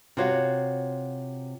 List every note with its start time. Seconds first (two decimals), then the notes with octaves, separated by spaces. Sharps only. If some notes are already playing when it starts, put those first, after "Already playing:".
0.17 C3 F4 F#4 C#5 F5